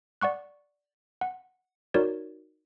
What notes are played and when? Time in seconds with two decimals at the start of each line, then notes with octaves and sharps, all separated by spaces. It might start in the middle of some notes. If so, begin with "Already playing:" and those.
0.21 D5 F#5 C#6 F#6
1.21 F#5
1.94 D#4 F#4 A#4 C#5 D5